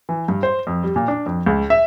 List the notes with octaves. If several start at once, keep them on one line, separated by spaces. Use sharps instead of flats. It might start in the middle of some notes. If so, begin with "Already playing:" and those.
E3
G2
C5
F2
G3
A#2
D4
F2
C#2
E5